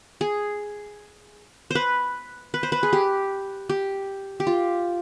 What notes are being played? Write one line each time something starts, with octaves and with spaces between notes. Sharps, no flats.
G#4
B4 C5
B4
C5
B4
G#4
G4
G4
G4
F4